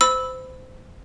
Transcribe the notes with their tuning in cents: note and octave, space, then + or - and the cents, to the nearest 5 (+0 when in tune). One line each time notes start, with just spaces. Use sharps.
C5 -25 B5 +10 E6 -10